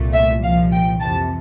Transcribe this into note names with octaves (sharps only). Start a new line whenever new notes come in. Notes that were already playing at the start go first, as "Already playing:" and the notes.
Already playing: C2 A#2 A3
E5
C2 A#2 F3 F5
G5
F2 C3 E3 A5